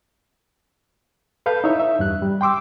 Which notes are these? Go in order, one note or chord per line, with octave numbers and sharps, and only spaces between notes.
A4 B4 F5 G6
D#4 E4 C#5 E5
E5
E2 G2 F#6
G3
G5 C6 D6 E6